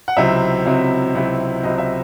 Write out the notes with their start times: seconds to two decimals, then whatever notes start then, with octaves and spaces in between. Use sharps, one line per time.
0.08 F#5
0.17 C#2 C3 F#3 C4 E4 E5
0.65 C#2 C3 F#3 C4 E4
1.15 C#2 C3 F#3 C4 E4
1.63 C#2 C3 F#3 C4 E4 D#5
1.78 E5